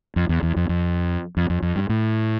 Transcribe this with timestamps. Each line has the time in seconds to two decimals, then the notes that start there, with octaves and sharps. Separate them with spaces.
0.16 F2
0.29 E2
0.43 E2
0.56 F2
0.69 F2
1.37 F2
1.50 F2
1.62 F2
1.76 G2
1.89 A2